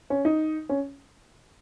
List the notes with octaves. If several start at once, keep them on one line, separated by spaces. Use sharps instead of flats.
C#4
D#4
C#4